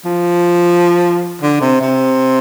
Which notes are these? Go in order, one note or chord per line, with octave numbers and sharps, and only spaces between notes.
F3
D3
C3
C3